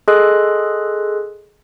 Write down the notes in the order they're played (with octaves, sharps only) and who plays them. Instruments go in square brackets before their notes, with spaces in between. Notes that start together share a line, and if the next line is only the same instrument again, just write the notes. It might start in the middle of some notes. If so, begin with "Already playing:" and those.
[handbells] G#4 A4 D#5 C6 F#6